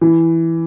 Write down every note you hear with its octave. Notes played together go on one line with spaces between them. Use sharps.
E3